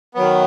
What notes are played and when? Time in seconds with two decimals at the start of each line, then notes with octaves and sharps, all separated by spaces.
0.15 D#3 F#3 B3